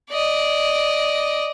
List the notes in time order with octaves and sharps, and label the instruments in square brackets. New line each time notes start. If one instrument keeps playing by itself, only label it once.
[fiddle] D5 D#5